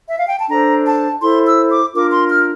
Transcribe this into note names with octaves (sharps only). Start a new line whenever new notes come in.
E5
F5
G5
A5
D4 A4 C5 A#5
A5
E4 A4 C5 C6
E6
D6
D4 F4 A#4 D6
C6
F6